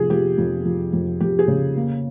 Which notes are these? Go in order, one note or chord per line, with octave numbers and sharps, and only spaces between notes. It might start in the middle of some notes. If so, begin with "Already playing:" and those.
Already playing: F1 F3 G#4
F3 G4
F2
F3
F2
F2 G4
G#4
C#3
A#3